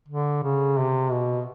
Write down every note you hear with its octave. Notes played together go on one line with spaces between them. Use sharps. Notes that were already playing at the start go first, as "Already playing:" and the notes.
D3
C#3
C3
B2